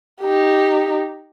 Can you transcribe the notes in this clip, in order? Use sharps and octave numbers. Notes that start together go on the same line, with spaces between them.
D#4 G4